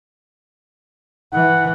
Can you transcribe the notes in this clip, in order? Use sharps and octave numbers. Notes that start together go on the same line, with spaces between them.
E3 F#5